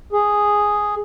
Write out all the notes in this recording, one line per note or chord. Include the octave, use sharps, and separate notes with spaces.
G#4